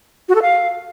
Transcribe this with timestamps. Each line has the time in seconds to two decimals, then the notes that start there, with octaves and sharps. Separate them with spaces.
0.29 F#4
0.35 A4
0.42 F5